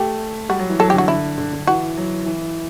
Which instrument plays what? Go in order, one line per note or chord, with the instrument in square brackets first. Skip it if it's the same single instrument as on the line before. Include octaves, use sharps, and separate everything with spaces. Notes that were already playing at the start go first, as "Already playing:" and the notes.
Already playing: [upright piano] A3 [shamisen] G4
[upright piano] G3 [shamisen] F#4
[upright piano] F#3
E3
[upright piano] F#3 [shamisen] A4
[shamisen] G4
[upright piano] D3 [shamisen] F#4
[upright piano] D3 [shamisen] E4
[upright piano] D3
D3
[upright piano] E3 [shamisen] F#4
[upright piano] F#3
E3